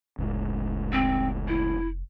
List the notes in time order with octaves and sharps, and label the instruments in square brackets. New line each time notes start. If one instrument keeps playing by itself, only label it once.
[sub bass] F1 [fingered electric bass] C#2 A2 G#3
[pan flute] C4
E4